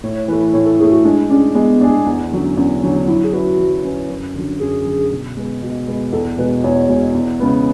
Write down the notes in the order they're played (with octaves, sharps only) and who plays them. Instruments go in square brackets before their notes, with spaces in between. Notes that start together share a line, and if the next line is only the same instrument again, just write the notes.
[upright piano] A2 [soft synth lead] C#5
[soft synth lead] C#5
[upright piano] E3 [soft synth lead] B4
[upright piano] A3
[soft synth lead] B4
[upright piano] A2 [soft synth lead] C#5
[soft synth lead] A4
[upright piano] E3 A3 [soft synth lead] G#4
[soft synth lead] F#4
[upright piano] G#3 [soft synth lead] D4
[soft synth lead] C#4 [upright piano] D4 G#4
[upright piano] G#3 [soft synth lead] B3
[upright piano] D4 G#4
E2
D3 F#3 C#4
[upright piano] E2 [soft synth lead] C#4
[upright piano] D3 F#3 C#4 [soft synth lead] D4
[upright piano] F#3 [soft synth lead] E4
[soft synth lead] G#4
[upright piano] C#4 E4 B4 [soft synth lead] F#4
[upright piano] F#3
C#4 E4 B4
F#2
D3 F#3
[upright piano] F#2 [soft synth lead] G#4
[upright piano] D3 F#3
B2
G#3 B3
B2
G#3 B3
[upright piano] E2 [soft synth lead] A4
[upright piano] B2 G#3 [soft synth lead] B4
[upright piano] E2 [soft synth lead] C#5
[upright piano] B2 G#3
E2
C#3 G#3 B3